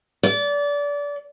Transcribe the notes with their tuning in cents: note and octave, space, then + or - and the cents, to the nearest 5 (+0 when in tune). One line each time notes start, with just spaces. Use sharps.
D5 -25